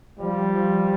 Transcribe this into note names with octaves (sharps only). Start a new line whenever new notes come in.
F3 G3
F3